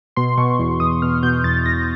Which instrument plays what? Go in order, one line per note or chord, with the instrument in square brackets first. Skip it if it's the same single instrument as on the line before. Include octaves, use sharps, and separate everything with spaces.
[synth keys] B2 C6
B2 C#6
E2
E2 D#6
B2 F6
B2 G6
E2 A6
E2 A#6